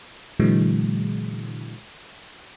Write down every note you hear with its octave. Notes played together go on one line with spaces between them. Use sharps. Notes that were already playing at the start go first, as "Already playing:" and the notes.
A#2 D3 E3 F#3 G#3